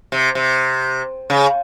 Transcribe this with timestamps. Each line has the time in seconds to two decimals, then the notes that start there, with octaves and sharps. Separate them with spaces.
0.12 C3
0.35 C3
1.30 C#3